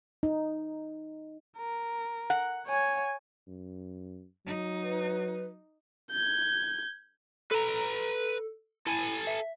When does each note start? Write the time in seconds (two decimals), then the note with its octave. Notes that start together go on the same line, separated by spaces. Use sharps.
0.23 D#4
1.58 A#4
2.30 F#5
2.67 C#5 G#5
3.48 F#2
4.46 F#3 D#4
4.83 B4
6.11 G6 G#6
7.51 A4 B4 A#5
8.87 E4 A4 G#5
9.27 E5